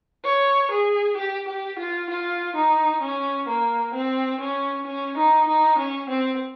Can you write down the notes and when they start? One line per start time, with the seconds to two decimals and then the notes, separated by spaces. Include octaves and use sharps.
0.25 C#5
0.71 G#4
1.17 G4
1.48 G4
1.79 F4
2.10 F4
2.56 D#4
3.02 C#4
3.48 A#3
3.94 C4
4.40 C#4
4.86 C#4
5.17 D#4
5.48 D#4
5.79 C#4
6.09 C4